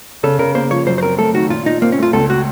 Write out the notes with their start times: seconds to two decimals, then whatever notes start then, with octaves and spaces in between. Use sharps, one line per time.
0.23 C#3 A4
0.39 C#3 A#4
0.55 A#3 C5
0.71 F3 C#5
0.87 F#2 C5
0.98 C5
1.03 C4 A#4
1.18 A3 A4
1.34 D#3 F#4
1.50 A#2 F4
1.66 A#2 D#4
1.82 A#3 C4
1.92 C#4
1.98 A3 F4
2.13 C#2 A4
2.30 F#4